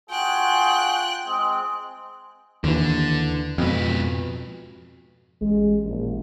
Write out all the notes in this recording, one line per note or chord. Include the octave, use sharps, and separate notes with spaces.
F4 F#4 G#4 G5 F#6
G#3 C4 D#6
D#2 D3 E3
F2 G#2 B2 B4
A1 G#3
A#1